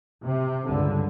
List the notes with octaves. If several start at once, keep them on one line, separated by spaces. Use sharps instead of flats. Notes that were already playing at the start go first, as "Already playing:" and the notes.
C3
C#2 G2 D3